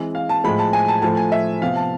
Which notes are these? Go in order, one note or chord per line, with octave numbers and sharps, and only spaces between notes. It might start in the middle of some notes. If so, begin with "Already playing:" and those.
Already playing: E3 G#3 C4
F5
A5
A2 F3 G#3 B5
A5
G#5
A5
A2 F3 A3 A5
G#5
E5
C3 F3 B3 F5
A5